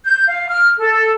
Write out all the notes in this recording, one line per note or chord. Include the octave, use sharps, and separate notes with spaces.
G6
F5
F6
A4